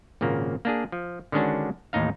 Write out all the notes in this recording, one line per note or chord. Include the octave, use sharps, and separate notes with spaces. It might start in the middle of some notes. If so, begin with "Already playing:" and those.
G#1 A#2 C#3 A#3
A#3 D4 G#4
F3
D3 D#3 G#3 C#4 D4 F#4
A1 D#2 A2 D#4 F5